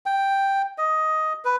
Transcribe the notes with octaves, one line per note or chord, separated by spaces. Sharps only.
G5
D#5
B4